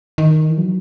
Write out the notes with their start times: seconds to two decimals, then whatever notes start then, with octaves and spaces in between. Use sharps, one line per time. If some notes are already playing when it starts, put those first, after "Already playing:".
0.18 D#3
0.50 E3
0.58 F#3